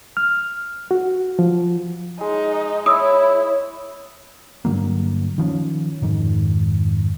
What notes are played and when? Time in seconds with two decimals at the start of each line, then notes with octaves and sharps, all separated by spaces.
0.17 F6
0.91 F#4
1.39 F3
2.21 G#3 D#4
2.86 E4 C#5 D#6 E6
4.65 G2 D3 F#3 A#3
5.38 D#3 F3 A#3 C#4
6.02 F2 G#2 D#3